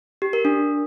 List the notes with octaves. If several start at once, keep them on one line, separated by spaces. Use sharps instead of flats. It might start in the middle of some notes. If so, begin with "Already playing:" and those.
G4
A#4
D4